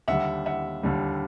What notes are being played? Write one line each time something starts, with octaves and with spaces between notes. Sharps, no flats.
D#2 D3 G3 E5 F#5
E5 F#5
D#2 D3 G3